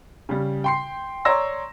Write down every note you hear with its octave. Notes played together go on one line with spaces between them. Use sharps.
C#3 G3
G5 C6 C7
C#5 D5 A#5 C6 E6 A#6